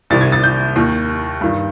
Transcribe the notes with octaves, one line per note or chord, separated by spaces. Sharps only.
C2 C3 D#3 A6
G#6
A6
G6
D#2 D#3
G2 D#3